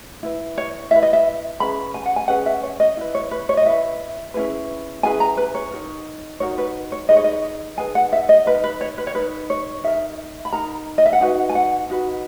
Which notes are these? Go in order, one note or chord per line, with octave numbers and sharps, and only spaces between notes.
E4 B4
C#5
E4 B4 E5
D#5
E5
C#4 G#4 B4 B5
G#5
F#5
G#5
C#4 G#4 B4 F#5
E5
C#5
D#5
E4 B4
C#5
B4
C#5
D#5
E4 B4 E5
C#4 E4 G#4 B4
C#4 E4 G#4 B4 G#5
A#5
B4
C#5
D#4 F#4 A#4
D#4 F#4 A#4 C#5
B4
C#5
D#4 G#4 B4 D#5
C#5
D#5
D#4 G#4 B4 G#5
F#5
E5
D#5
D#4 A#4 B4
B4
C#5
B4
C#5
D#4 A#4 B4
C#5
D#4 A#4 E5
B5
D#4 A#4 A#5
D#5
E5
F#5
D#4 F#4 B4 G#5
G#5
F#5
D#4 F#4 B4